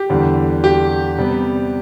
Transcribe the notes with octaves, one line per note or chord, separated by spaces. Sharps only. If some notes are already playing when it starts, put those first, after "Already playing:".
Already playing: G4
E2 D3 G3
G4
C3 G3 B3